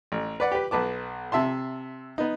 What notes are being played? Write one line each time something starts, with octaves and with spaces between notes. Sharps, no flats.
A1
B4 D5 F#5
G4 B4
B1 B4 A5 D6
C3 E5 A5 C6
B3 D#4